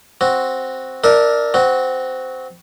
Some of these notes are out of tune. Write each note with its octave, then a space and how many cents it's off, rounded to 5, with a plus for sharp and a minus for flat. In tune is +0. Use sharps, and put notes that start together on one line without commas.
C4 +0 F#4 +0
D4 +10 A#4 +0 E5 -30
C4 -15 F#4 +0